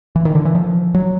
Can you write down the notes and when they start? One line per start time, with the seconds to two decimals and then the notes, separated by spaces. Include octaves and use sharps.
0.16 E3
0.25 D#3
0.35 D3
0.45 E3
0.55 F3
0.94 F#3